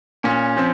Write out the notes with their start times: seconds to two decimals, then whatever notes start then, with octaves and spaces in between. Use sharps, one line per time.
0.24 A#2 C#4
0.57 F3 C4